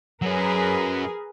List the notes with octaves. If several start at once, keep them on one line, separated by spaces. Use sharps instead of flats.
F#3 C#4 G#4 A#4 B4